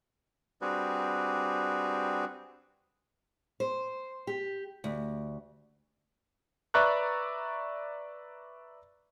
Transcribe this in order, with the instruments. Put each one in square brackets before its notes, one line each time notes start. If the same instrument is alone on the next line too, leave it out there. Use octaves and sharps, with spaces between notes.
[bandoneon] G3 C4 D4 F#4 G#4 B4
[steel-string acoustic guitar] C5
G4
D2
[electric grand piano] B4 D5 E5 A#5 C#6 F#6